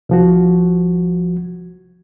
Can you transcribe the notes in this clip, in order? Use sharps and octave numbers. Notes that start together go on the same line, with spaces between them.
C2 F3 F#4